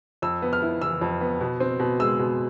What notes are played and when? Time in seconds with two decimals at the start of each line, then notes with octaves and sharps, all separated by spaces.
0.22 F2 E6
0.42 B3
0.53 F6
0.62 E4
0.82 E3 E6
1.01 F2
1.21 B3
1.41 B2
1.60 C4
1.80 B2
2.00 G#3 E6
2.19 B2